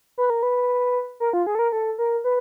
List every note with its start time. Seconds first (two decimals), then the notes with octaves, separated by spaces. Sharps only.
0.18 B4
0.30 A#4
0.43 B4
1.20 A#4
1.33 F4
1.47 G#4
1.55 A4
1.59 A#4
1.72 A4
1.98 A#4
2.24 B4